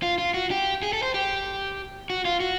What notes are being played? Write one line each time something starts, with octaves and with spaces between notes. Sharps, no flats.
F4
F4
F#4
G4
G#4
A4
C5
G4
F#4
F4
F#4